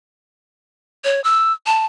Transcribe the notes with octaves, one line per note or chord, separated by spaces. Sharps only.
C#5
E6
A5